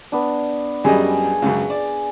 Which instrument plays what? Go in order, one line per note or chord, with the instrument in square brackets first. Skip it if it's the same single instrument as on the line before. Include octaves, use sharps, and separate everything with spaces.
[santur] B3 D4
[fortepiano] F#2 G3 D#5 [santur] G#4
[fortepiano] C#2 F#2
D5